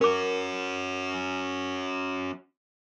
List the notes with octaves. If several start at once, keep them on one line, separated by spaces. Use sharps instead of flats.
C#4 F#4 A#4 D6